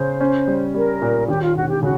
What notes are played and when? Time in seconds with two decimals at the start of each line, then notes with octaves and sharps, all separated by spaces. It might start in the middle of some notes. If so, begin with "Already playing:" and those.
Already playing: C#3 C5
0.20 C#4
0.47 G3
0.74 G3 A#4
1.02 A#2
1.28 D#2 G4
1.42 F4
1.55 E1 F#4
1.69 G4
1.83 C#3 F#4